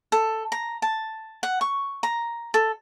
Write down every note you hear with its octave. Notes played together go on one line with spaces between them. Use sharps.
A4
A#5
A5
F#5
C#6
A#5
A4